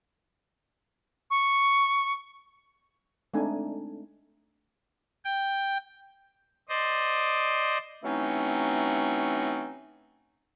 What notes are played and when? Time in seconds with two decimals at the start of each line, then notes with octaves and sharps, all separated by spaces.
1.30 C#6
3.34 G#3 A3 C4 D4 D#4 G#5
5.25 G5
6.69 C5 D5 D#5
8.04 E3 F#3 A3 C4 C#4 D#4